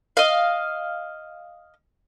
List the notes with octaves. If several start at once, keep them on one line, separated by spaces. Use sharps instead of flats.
D#5 F5